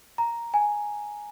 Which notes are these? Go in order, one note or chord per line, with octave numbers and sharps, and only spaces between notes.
A#5
G#5